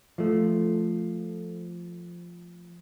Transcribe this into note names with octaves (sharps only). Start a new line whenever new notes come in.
F3 A3